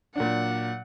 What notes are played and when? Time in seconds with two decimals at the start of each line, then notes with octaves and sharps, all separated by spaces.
0.16 A#2 F#3 D4 F#5